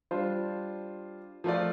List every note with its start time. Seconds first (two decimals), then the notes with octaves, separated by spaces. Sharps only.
0.11 G3 D4 F4 C5
1.44 F3 A3 F4 D5